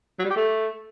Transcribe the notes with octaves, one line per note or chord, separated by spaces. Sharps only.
F#3
G3
G4
A3